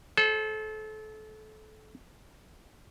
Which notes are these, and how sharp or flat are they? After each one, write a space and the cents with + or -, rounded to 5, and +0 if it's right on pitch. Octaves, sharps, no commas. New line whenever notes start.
A4 -30 C5 +20